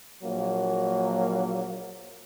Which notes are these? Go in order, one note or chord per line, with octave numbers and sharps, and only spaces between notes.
A#1 F#3 A#3